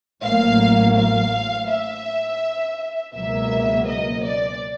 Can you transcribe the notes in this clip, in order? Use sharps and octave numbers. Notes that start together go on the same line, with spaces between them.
A1 A2 F#3 A#3 F5
F5
E5
C#2 B2 F#3 A#3 E5
D#5
D5